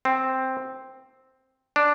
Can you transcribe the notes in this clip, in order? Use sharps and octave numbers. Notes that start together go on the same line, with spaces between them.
C4
D4